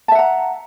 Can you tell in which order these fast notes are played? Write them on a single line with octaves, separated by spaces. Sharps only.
A5 E5 F#5 A#5